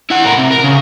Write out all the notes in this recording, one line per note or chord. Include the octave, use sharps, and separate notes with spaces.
E4 F#5
A2 A#4
C3
A#4
C#3